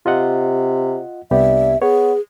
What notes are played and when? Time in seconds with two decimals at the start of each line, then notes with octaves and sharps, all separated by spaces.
0.06 C3 F4 D#5 F#5
1.31 C2 B3 D4 G4 E5
1.82 B3 G#4 C#5